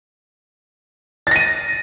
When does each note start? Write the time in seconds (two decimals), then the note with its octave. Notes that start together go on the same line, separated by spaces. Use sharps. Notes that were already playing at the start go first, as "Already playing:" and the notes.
1.27 A6
1.31 A#6
1.36 D#7